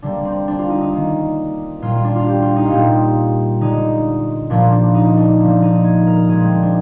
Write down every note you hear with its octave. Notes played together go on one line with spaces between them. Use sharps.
D3 G3 A#3 D4
C4
D4
F4
D#4
D#4
D#3 A#3
A#2 G3 A#3 F4
F4
D4
F4
G4
F4
D#4
F4
A#2 G3 A#3 G4
D3 G#3 D#4
A#2 F3 A#3 D4
D4
D#4
D4
D3 F3 A#3
D#4
G#4
A#4
A#2 G#3 G#4
C4
D4
D4